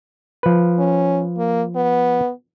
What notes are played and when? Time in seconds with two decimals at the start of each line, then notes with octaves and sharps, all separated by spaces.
0.43 F3 B4
0.79 C#4
1.38 A#3
1.76 B3